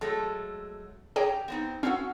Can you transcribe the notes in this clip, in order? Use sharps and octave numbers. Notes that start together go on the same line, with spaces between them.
F#3 G#3 A3 A4
G4 G#4 C#5 G5 A#5
B3 C4 D#4
C4 C#4 F#4 A4 F5